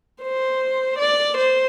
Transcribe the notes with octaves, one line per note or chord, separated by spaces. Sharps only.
C5
D5
C5